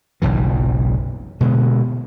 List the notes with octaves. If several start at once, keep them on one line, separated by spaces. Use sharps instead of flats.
F#1 B1 G#2 E3
B2 D3 G#3